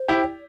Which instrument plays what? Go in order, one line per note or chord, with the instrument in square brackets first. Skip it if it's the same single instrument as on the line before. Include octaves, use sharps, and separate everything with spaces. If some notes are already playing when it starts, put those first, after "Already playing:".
Already playing: [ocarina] C5
[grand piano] E4 G4
[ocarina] D5